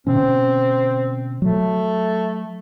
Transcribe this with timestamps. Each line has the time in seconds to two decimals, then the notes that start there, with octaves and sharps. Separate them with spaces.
0.07 B2 D3 C4 C#4
1.42 F#3 A3